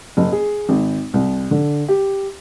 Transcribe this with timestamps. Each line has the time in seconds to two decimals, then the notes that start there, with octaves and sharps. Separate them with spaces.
0.17 F#1
0.32 G#4
0.69 G#1
1.14 C2
1.51 D3
1.88 G4